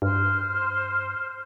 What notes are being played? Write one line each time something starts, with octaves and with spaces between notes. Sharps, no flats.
G2 C5 F6